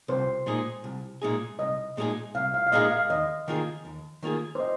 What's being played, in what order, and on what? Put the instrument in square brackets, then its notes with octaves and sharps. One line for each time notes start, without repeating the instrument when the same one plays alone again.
[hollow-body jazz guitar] C2 [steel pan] C5
[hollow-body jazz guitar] A#2 G#3 D#4 G#4
C2
A#2 G#3 D#4 G#4
[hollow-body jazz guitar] C2 [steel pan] D#5
[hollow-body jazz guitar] A#2 G#3 D#4 G#4
[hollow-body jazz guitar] C2 [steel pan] F5
[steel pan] F5
F5
[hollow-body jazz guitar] A#2 G#3 D#4 G#4 [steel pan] D#5
[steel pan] F5
[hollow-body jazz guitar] D#2 [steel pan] D#5
[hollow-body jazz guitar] D#3 A#3 F4 G#4
D#2
D#3 A#3 F4 G#4
[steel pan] C5
D#5